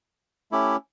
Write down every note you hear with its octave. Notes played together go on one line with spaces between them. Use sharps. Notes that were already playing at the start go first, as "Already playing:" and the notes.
A3 C#4 E4 G4